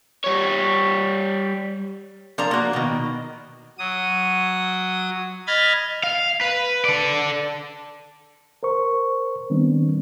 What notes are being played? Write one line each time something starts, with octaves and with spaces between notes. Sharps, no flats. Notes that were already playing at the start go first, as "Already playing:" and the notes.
G3 C#5
F3 D4 A#4 A#5
A#3 F#4
B2 D#3
F#3 D#6
D#5 B5 F6 G#6 A6
F5
B4
A4 D5
A#4 C5 C#6
D#3 G3 B3 C4 D4